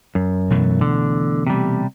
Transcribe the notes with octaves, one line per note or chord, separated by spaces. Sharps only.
F#2
B2 E3 A3
D3
C3 G3